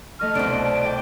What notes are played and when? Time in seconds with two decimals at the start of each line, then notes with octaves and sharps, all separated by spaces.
0.19 A3 D#5 C#6 F6
0.35 C2 B2 D4 C5 D7
0.85 D5 G5